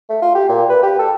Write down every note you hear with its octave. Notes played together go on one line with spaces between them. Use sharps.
A3
F4
G4
A#2
B4
G4
A4